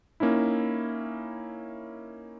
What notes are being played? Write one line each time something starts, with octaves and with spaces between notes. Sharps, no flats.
A#3 C#4 D#4 E4